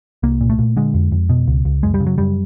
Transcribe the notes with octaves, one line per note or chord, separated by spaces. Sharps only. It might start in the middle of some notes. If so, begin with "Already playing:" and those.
C2 A#3
A#2
A3
A#2
D3 G#3
F2
F2
B2
C#2
C#2
F#2 G#3
G3
C#3
F#3
F#2 G3